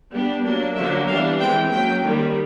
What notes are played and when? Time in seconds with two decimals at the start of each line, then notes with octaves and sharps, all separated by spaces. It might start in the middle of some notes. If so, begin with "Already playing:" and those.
0.11 G3 B3 D4
0.43 F#3 A#3 D4
0.76 D3 F#3 A#3 D4 E5
1.07 E3 G3 B3 D4 F5
1.40 E3 G#3 C4 G5
1.72 F#3 A#3 C#4 G5
2.04 D#3 G3 A#3